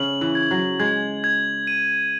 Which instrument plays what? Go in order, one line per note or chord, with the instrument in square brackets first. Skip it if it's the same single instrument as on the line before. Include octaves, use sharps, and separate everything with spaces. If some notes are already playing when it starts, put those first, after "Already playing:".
Already playing: [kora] C#3 [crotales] F#7
[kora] E3
[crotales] G#6
[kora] F#3
[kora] G#3 [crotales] G#6
[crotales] G#6
D#7